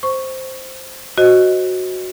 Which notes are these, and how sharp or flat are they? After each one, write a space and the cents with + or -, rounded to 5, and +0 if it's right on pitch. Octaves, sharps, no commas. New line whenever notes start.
C5 +0 C#6 +0
F#4 +0 C5 +0 D#5 +0